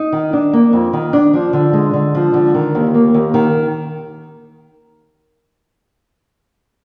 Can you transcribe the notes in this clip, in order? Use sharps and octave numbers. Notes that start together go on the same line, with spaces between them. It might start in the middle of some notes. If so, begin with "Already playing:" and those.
Already playing: D#4
D#3
D4
A#3
F2
D#3
D4
F3
D3
G#3
D3
F3
D3
D#3
D#2
A#3
D#2
D#3